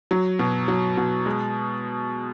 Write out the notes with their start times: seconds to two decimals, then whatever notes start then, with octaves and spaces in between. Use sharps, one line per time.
0.11 F#3
0.39 B2
0.68 F#3
0.97 B2
1.26 G#3